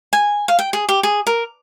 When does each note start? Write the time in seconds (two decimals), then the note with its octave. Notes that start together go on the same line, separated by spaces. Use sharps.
0.13 G#5
0.48 F5
0.59 G5
0.73 G#4
0.89 G4
1.03 G#4
1.27 A#4